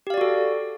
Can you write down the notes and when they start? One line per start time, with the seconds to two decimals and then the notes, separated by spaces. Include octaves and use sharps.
0.07 G4
0.10 F5
0.14 D5
0.18 F#4
0.21 A4